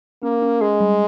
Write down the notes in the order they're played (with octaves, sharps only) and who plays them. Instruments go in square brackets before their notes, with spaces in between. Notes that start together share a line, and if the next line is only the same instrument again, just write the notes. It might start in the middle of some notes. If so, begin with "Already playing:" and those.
[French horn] A#3 [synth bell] C#4
[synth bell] C#4
[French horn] G#3 [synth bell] G#4
[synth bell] G3